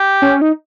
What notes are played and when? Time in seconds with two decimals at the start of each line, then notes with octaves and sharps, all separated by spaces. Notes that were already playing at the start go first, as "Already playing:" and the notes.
Already playing: G4
0.22 C#4
0.42 D#4